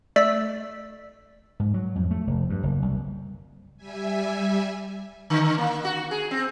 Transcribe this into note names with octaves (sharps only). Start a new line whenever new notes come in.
A3 D5 E6 B6
G#2
F#3
F2
A3
F1
G2
F#1
C2
G3 E5 G#5
D3
A#3
F#4
G#4
C4